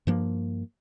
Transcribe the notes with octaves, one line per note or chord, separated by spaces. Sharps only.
G2 F3 A#3